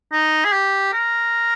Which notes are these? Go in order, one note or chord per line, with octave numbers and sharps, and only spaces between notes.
D#4
G#4
G4
A#4